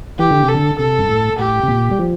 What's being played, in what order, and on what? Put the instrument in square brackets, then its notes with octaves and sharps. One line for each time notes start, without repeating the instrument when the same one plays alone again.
[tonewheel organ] E3 [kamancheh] G4
[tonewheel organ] D3
C3
[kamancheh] A4
[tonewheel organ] D3
[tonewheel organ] C3 [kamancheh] A4
[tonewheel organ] G2
A2
[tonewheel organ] A2 [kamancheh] G4
[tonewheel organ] C3
A#2
G3
F3